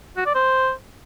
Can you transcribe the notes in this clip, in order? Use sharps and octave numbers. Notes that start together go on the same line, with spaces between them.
F#4
D5
C5